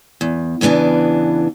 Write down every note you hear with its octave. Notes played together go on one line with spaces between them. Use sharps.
E2
E2 C#3 E3 B3 D4